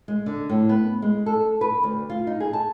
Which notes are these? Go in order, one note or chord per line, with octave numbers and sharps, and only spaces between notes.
G#3
D3
A2
B3
G#3
A4
B4
D2
F4
D#4
G#4
A5